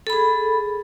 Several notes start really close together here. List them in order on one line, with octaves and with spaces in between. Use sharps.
A4 B5 G#4